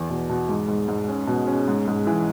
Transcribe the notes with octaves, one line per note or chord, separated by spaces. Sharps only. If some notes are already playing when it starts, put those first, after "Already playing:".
Already playing: E2
B2
B2
G#2
G#2
G#2
C#4
B2
C#4
G#2
G#2
E3